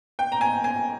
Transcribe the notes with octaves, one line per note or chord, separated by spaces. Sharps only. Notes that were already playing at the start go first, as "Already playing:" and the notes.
G5
A#5
G#5
G#5